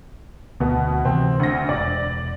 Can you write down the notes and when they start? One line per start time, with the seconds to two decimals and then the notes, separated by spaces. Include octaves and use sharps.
0.60 D2 B2 B3
1.05 C3 E3 C4
1.40 D2 A#6
1.69 E1 D5